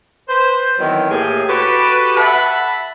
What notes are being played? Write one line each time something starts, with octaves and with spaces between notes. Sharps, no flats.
B4 C5
D#3 E3 F#3 B3 C4
A2 A#3 G4 G#4
F#4 G4 A4 B4
E5 F#5 A5 B5